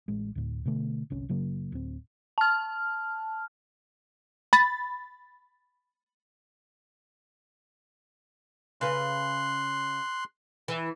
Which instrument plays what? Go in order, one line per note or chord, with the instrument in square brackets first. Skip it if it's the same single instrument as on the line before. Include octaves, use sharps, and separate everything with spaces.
[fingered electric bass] A1 G#3
D2 A2
B2 D3 A3
G1 C2 C#4
F#1 C#3 F#3 A#3
D1 C4
[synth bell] A5 F6
[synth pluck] B5 A6
[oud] C#3 B4 [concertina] C6 F#6
[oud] E3